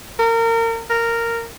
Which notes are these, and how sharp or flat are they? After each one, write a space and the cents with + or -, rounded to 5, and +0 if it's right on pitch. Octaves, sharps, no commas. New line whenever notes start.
A#4 -30
A#4 -10